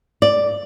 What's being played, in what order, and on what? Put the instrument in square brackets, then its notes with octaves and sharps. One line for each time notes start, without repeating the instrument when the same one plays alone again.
[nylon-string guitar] D5